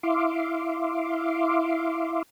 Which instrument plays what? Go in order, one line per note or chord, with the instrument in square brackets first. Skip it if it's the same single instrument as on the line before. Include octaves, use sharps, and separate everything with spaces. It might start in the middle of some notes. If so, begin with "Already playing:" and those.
[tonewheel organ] E4 E5 F5 C6 D6